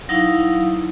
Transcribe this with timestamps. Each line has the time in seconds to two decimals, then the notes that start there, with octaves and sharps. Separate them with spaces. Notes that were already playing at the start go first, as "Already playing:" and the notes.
0.09 F#3 D#4 E4 F5